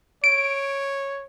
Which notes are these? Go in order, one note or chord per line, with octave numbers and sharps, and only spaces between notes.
C#5 D7